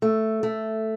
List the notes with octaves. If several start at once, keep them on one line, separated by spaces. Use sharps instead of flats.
A3
A3